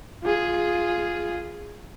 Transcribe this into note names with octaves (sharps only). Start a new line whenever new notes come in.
F4 G#4